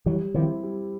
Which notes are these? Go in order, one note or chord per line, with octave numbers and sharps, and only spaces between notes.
E3 F#3 G3
D#3 F3 C4 E4 G4
G3